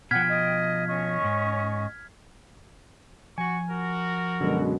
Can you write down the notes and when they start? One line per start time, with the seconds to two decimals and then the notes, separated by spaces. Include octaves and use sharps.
0.11 B2 F3 F#5 G5 F6 G#6 B6
0.29 D#5
0.88 C#4 D#5 C#6
1.21 D#2 G#2
3.38 F3 F#4 G#5 C#6
3.69 F#4 A#4
4.41 F#2 B2 D3 G#3